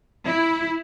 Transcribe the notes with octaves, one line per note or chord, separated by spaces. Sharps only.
E4